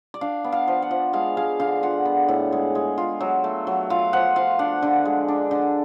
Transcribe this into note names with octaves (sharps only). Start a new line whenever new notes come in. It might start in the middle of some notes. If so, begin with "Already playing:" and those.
D5
D4 F5
B3
F5
F3
F#5
F3
G#3 F5
G#3 F5
D3 F5
F4 F#5
B3
A2
G#3
G#3
F4
F#3
A3
F#3
F4 F5
F3 F#5
F3 F5
D4 F#5
D3
G#3
D4
D3